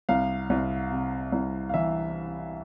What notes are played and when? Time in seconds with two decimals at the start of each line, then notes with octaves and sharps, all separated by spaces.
0.09 C2 F5
0.50 C2
0.91 C3
1.32 C2
1.69 F5
1.74 E3 E5